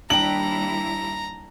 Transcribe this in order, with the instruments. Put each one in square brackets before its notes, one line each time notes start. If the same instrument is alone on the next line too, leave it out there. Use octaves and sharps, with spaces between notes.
[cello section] D#2 G3 E4 [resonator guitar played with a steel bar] D4 G5 [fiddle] A#5 [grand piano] F#7